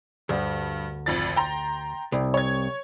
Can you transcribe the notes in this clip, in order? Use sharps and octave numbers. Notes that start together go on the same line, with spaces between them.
D2 G2
G#1 F2 A6
G5 A#5 C6
C2
C#5 G#6